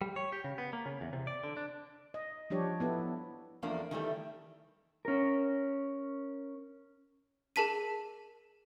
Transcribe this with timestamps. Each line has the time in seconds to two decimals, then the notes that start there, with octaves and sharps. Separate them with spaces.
0.02 G3
0.16 C#5
0.32 G4
0.44 C#3
0.58 B3
0.73 A#3
0.86 C#3
1.01 E2
1.13 C3
1.27 D5
1.44 D3
1.57 D4
2.14 D#5
2.50 F3 G3 D4 G4 C#5
2.80 B3 E4 A4
3.63 E2 F3 A3 A#3 D4
3.91 D#3 E3 G3 A3
5.05 C#4 A#4
7.56 G#4 A#4 A5 B6 D#7